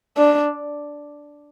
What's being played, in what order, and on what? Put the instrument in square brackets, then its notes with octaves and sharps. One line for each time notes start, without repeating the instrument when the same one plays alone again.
[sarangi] D4